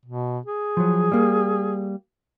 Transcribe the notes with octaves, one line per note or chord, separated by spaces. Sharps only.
B2
G#4
F3 F#3
G3 A#3